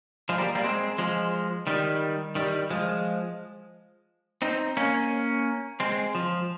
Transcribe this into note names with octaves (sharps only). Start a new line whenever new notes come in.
F3 G#3
G3 A#3
G3 A#3
G#3 C4
F3 G#3
D#3 G3
D#3 G3
F3 G#3
C4 D#4
A#3 C#4
G#3 C4
F3